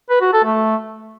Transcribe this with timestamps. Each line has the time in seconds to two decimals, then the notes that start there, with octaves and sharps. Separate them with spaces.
0.10 B4
0.21 F#4
0.33 A4
0.45 A3